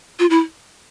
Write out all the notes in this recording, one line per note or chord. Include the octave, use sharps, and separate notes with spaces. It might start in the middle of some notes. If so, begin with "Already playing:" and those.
F4
E4